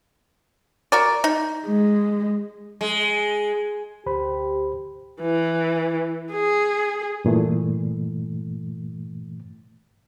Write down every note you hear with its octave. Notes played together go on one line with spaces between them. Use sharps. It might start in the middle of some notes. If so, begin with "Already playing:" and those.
F#4 A#4 D5
D#4
G#3
G#3
D2 G4 C5 B5
E3
G#4
G2 A#2 E3 A3